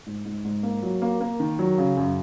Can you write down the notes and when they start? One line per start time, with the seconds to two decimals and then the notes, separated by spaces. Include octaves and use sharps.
0.06 G#2
0.25 G#2
0.45 G#2
0.63 A#3
0.82 F#3
1.02 A#3
1.21 A#3
1.40 D#3
1.59 F#3
1.78 C#3
1.97 F#2